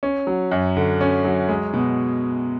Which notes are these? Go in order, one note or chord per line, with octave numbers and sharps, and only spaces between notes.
C#4
F#3
F#2
D3
C#4
F#3
G#3
B2